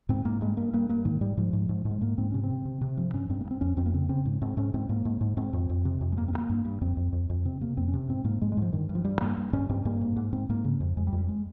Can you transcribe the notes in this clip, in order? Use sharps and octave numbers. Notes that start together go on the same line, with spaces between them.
G#2 C4
G#2 A#3
G2 G#3
G2 A#3
G2 A#3
G2 A#3
G#2 D#3
G#2 G3
G#2 F3
G#2
G#2
G#2
G#3
G#2 A#3
G#2 C4
C3 C#4
C4
C3
C3
C3
G2 F3
G2 C#4
G2 C4
A#3
G2
C4
F2 C#4
F2 C4
A#3
C#3 C4
C#3 C4
G#2
G#2 C4
G#2 C#4
G#2 C4
G#2 A#3
G#2
G#2
G#2 C4
F2
F2
C3
F2
G#3
G2 A#3
C4
G2
A#3
G2
G2
F2 C4
F2
F2
F2
C3 C4
C3 A#3
F2 C4
C#4
C3
G#2 C4
G#2 A#3
G#2 G#3
G#3
G#2 F3
G2 D#3
G2
F3
G2 G3
G2 A#3
G2
G2 C#4
G2 C4
G2 A#3
G#2
G#2
G#2 C4
G#2 A#3
C#3
F2
F2 G#3
G3
F2
G3
G#3